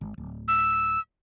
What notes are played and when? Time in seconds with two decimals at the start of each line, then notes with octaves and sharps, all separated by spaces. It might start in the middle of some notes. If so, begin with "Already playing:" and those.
0.01 G#1
0.18 D1
0.48 E6